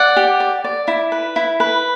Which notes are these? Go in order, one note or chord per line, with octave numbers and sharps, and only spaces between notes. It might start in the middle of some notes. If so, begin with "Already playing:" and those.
Already playing: D5 F#5
G4
D5
D5
E4
B4
E4
B4